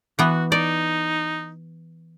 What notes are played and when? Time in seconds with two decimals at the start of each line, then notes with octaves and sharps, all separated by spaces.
0.19 E3 B3 F#4
0.52 D#4 D5